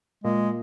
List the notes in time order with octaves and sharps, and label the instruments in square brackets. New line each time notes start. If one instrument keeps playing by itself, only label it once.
[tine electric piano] A#2 A#3 [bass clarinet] G#3